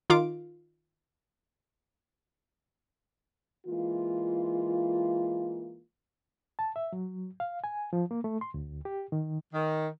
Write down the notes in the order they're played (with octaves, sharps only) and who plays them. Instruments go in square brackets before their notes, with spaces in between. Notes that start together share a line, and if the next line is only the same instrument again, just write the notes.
[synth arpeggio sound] D#3 F4 D6
[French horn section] E3 G#3 A#3 F4
[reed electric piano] A5
E5
F#3
F5
G#5
F3
A#3
A3
C6
D2
G4
D#3
[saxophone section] D#3